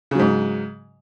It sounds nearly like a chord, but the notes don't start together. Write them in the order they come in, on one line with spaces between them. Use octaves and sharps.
C#3 F#3 G#2